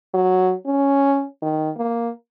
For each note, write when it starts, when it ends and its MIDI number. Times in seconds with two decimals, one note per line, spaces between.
0.14 0.53 54
0.66 1.25 61
1.42 1.70 51
1.77 2.11 58